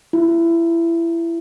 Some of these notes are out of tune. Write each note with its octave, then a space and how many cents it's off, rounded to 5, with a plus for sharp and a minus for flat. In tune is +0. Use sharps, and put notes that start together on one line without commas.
E4 +25